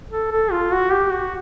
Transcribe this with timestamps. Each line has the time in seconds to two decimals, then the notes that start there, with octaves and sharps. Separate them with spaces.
0.10 A4
0.31 A4
0.51 F4
0.72 F#4
0.92 G4
1.12 F#4